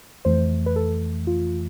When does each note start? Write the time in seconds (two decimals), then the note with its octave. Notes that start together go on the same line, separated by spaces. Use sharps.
0.25 F2 E3 A3 C5
0.66 B4
0.76 A4
1.27 F4